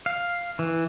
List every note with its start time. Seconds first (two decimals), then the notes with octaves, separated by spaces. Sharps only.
0.06 F5
0.59 E3